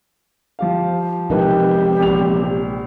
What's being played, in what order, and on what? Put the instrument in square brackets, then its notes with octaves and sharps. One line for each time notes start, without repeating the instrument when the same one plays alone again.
[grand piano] F3 G4 F5
[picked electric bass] C3 F3 G#3 [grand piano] D#4 A#4 B4 [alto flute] G4
[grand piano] A#1 F7